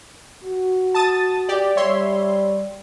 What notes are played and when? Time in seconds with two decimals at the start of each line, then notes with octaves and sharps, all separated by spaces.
0.44 F#4
0.94 A5 D#6 A6
1.49 G4 D5
1.77 G3 C#5 E5 C6